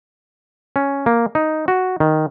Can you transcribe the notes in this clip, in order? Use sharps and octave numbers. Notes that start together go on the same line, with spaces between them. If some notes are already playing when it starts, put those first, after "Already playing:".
C#4
A#3
D#4
F#4
D#3